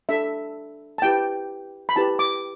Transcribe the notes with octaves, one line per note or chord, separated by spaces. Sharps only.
D4 A4 E5
A5
E4 G4 B4 G5
B5
E4 G4 B4 A5
D6